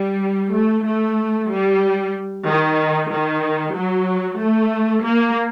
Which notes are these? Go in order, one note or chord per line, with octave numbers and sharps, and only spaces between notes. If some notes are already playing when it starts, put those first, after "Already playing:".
Already playing: G3
A3
A3
G3
D#3
D#3
F#3
A3
A#3